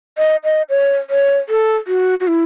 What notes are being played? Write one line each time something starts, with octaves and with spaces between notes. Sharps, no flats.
D#5
D#5
C#5
C#5
A4
F#4
F#4
E4